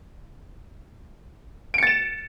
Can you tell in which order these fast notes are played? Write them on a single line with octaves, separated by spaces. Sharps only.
D7 C#7 A6 E7